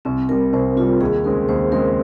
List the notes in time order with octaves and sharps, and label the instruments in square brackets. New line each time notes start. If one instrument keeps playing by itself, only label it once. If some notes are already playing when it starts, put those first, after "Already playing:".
[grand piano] C2 [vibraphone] C4
[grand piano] C3 G3 [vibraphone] A#4
[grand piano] C2 [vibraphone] C5
[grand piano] C3 G3 [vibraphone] F4
[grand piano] D#2 [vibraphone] G#4
[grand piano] C#3 G#3 C4 [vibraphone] A#4
[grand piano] D#2 [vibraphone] C5
[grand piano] C#3 G#3 C4 [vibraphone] A#4